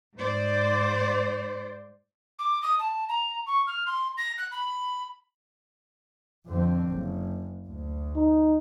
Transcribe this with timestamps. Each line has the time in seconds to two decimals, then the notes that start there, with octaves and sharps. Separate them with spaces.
0.17 G#2 C5 D5
2.39 D6
2.63 D#6
2.79 A5
3.09 A#5
3.47 C#6
3.67 F6
3.86 C6
4.18 A#6
4.38 F#6
4.52 B5
6.47 F2 D3 C4
6.91 F#1
7.67 D2
8.16 D#4